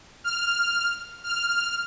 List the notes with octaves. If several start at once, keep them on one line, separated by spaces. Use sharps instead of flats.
F6
F6